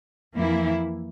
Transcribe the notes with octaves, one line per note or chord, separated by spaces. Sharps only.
F2 E3 A#3 E4